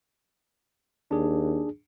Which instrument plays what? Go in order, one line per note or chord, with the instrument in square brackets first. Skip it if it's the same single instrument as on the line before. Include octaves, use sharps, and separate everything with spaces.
[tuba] D#2 [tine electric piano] D4 G#4